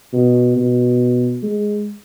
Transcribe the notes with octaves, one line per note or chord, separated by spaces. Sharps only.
B2
B2
G#3